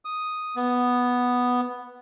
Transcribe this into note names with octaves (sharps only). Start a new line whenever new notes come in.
D#6
B3